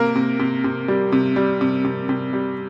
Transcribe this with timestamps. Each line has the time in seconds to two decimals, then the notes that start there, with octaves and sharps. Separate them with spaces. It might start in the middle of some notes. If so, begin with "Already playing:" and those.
Already playing: C3 A#3 A#4
0.16 C3
0.39 C3
0.64 C3
0.88 G3
1.12 C3
1.36 G3
1.61 C3
1.85 C3
2.09 C3
2.33 G3